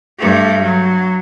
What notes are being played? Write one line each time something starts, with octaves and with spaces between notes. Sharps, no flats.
G2 A3
F#3